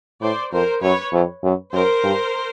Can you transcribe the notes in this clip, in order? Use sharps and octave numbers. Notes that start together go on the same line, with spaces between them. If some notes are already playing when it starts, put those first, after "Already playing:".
A2 C5 D5
F2 A#4 C5
F#2 B4 C#5
F2
F#2
F#2 A#4 C5
G2